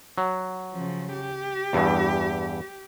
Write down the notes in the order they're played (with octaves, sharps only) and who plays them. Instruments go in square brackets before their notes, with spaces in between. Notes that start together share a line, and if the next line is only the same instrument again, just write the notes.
[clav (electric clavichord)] F#3
[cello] C#3 F3
G4
[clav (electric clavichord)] E2 G2 E3